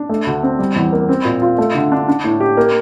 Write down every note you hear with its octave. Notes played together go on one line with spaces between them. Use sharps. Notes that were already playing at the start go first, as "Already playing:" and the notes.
Already playing: D4
A3
D2
C4
G3
E2
A#3
C4
A#2
F4
A3
D3
D4
D4
A2
G4
A#3